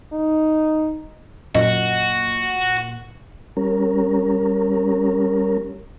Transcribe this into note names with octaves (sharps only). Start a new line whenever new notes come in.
D#4
F#2 A#2 F#4 D#5
G3 C#4 A#4